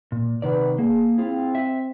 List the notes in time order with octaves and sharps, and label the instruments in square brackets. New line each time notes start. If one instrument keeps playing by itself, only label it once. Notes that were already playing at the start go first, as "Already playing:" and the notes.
[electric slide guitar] A#2
[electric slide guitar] C3 D#3 D5 [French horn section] B3 B4
[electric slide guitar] A#3 [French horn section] G#4
[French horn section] C4 [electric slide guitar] E4 F4 G#4
[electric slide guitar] E5